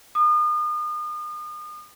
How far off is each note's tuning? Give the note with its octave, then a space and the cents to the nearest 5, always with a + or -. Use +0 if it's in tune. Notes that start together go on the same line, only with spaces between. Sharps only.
D#6 -40